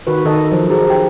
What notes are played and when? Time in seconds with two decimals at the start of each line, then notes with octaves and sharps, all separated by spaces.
0.07 D#3 F#4 B4
0.25 D#3 A4 D#5
0.52 F3 F#3
0.70 D#4 F#4 G#4 C5
0.87 G4 C5 G5